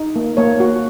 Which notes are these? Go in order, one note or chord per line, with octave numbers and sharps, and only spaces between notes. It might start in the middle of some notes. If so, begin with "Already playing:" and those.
Already playing: D#4
A#3
A#3 C#5
F#4